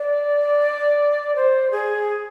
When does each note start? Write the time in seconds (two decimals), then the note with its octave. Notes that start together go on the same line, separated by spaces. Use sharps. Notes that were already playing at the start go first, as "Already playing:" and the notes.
Already playing: D5
1.36 C5
1.71 G#4